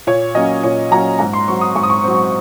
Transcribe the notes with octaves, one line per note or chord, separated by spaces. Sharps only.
A#2 C#5
F#3 A#3 C#4 D#5
A#2 C#5
F#3 A#3 C#4 A#5
G#2 A#5
C6
F#3 C4 C#6
D#6
G#2 C#6
D#6
C#6
F#3 C4